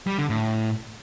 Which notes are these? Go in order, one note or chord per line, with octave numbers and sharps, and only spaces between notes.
G3
D3
A2